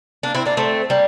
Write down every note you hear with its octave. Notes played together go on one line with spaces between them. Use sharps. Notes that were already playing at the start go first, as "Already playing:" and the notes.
A#3 D4
C4 E4
A#3 D4
A3 C4
G3 A#3